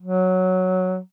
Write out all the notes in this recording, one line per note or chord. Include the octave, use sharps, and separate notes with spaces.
F#3